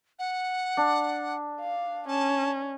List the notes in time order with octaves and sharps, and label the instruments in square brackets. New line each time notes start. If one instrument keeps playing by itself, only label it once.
[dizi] F#5
[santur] D4
[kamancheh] F5
[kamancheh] C#4 [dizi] A5